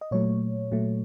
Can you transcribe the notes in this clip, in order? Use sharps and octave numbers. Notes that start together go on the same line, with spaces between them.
D#5
A#2 F#3 A3 C#5
A#2 F#3 A3